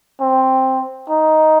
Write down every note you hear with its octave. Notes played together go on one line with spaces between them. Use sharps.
C4
D#4